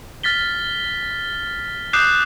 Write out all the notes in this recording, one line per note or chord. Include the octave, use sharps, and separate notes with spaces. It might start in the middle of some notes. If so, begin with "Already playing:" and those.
F6 A6 B6 G7
D6 D#6 F#6 G6 C7 E7